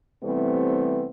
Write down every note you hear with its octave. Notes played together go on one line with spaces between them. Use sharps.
C3 E3 G3 A3 B3 C4